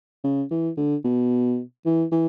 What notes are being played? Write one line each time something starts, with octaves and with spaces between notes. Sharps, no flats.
C#3
E3
D3
B2
E3
E3